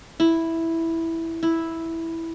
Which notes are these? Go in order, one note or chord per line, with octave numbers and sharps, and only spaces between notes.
E4
E4